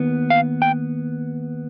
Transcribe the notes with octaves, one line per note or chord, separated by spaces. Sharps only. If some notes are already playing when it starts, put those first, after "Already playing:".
Already playing: D#2 B3
F5
G5